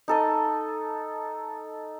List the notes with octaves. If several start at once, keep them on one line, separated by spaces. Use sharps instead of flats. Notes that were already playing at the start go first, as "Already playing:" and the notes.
D#4 A4 D#5